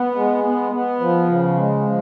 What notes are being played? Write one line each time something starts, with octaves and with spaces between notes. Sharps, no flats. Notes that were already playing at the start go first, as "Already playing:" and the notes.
Already playing: B3
G#3
B3
B3
F3
C#3
G#3
F3